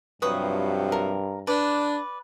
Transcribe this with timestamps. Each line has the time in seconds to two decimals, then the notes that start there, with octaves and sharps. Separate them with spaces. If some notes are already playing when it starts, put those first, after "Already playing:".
0.22 G2 C3 F3 F#3 B4 C#6 D#6
0.92 A#4
1.47 D4 B4 D5